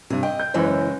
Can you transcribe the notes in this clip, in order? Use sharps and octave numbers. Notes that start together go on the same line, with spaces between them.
G2 C3 G#4
D#5 G5
G6
F#1 C#3 E3 G#3 C#4 C5